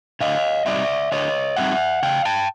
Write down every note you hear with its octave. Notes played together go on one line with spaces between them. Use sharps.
D3 D#5 F5
G3 C4 D#4 D5 E5
D3 C#5 D#5
G3 C4 D#4 E5 F#5
C#3 F5 G5
G5 A5